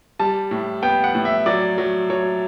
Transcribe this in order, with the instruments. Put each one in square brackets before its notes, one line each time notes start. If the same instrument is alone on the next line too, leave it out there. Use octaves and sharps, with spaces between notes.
[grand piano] G3 A5
A2
B3 G5
F#5
A2
E5
F#3 D5
F#3
F#3 C#5